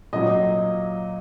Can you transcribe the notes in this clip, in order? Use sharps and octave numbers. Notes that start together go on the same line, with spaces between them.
A#2 F#3 D#5